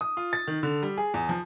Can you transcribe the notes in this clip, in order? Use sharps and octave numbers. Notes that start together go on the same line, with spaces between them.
D#6
F4
A6
D#3
D3
G3
G#4
E2
F3